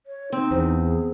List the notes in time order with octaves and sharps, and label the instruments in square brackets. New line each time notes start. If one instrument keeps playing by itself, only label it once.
[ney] C#5
[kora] C4 [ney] D#4
[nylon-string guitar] E2 [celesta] C5
[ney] G#4